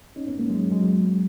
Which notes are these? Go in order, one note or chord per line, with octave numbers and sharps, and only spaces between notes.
C#4 D#4
B3 C#4
G#3 A#3
F#3 G#3
F#3 G#3
F#3 G#3